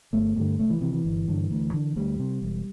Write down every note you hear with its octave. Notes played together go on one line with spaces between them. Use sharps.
G1 A3
G2 D3 A3
C2 A3
E3
C3 E3
E3
G1
G2 D3
D2
D3
D2 G3
C3
E1